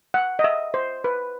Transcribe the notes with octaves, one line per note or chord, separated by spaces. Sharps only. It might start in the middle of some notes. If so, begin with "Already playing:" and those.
F#5
D#5
E5
C5
B4